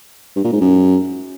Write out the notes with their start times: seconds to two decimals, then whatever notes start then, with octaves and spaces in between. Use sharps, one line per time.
0.36 G2
0.44 A#2
0.52 G#2
0.61 F#2